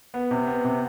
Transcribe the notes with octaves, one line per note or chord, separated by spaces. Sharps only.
B3
C3
B3
C3